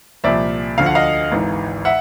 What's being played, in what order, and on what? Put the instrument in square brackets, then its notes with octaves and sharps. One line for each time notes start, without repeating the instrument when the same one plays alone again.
[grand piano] C2 A#2 F3 D5 E5
D2 D3 F3 F5
F#5
D#5 F5
G#1 G#2 E3
E5 F#5